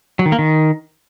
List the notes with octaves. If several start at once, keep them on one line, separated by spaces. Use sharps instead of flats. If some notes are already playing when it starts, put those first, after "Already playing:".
F#3
D#3
A#3
D#3